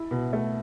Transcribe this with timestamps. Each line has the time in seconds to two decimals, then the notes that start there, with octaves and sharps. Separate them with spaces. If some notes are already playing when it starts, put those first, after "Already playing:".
Already playing: E4
0.11 B2
0.33 A3